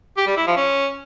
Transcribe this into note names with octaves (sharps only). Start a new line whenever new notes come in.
G4
G3
E4
F3
C#4